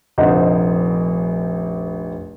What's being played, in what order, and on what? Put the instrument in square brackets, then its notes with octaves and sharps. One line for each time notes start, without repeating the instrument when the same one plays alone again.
[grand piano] F1 A#1 D#4 C5 D#5 F#5